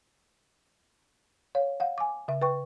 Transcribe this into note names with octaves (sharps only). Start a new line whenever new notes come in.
C#5 F5
F5 F#5
G#5 D6
C#3 E5
B4 G5 C#6